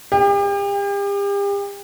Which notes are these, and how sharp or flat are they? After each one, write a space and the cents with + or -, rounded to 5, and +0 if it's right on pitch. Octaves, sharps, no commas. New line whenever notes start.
G4 +40